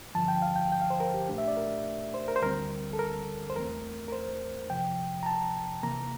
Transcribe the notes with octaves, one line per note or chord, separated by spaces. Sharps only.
G2 D3 F3 A5
G5
F5
G5
G5
F5
C5
A#4
G4
A#2 A3 D4 G4
E5
D5
A#4
C5
A#4
C5
D2 D3 G3 C4 A#4
A4
A#4
C5
E2 E3 A3 C4 A#4
A#4
C5
F2 C3 F3 G5
A#5
A5
C3 E3 A#3 A#5